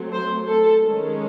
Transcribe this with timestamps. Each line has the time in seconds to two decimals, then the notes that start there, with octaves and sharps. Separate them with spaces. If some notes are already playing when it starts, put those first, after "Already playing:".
Already playing: F#3 A3 C4
0.13 C5
0.48 A4
0.83 D#3 G#3 C#4